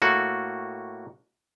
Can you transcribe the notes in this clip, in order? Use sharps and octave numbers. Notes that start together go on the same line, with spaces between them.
A2 A#3 F#4 A4